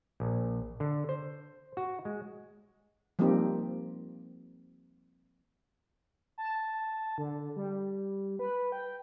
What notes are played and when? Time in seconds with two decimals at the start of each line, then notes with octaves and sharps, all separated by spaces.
0.20 A#1
0.80 D3
1.09 C5
1.77 F#4
2.05 G#3
3.19 F3 G3 A#3 C4 D#4 G4
6.38 A5
7.18 D3
7.56 G3
8.39 B4
8.72 G5